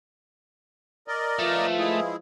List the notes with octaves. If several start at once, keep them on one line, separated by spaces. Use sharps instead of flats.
A#4 D5 D#5
F3 A3 F4 B4
G#3 E4 G#4